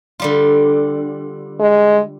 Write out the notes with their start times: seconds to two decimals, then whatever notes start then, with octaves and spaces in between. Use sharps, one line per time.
0.20 D3 G3 F4
1.60 G#3